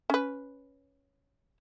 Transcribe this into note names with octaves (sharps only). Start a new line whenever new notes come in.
C#4 B4